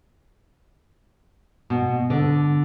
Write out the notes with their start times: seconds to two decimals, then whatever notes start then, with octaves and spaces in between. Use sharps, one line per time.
1.70 B2
2.10 D3